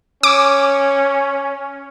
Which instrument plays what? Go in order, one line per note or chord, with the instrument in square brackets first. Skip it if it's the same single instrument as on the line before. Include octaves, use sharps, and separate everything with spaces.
[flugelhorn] C#4 [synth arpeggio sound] D6